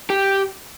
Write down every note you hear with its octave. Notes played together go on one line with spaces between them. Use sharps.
G4